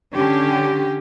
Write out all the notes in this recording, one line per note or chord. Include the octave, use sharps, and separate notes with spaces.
D3 C#4 G4